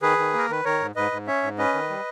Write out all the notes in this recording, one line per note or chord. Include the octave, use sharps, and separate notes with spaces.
D#3 G#4 B4
D#3
A#3 A#4
D#3 B4
D#3 A#4 C#5
G#2
G#2 B4 D#5
G#2
C#4 C#5 E5
G#2
C#4 B4 D#5
D#3
G3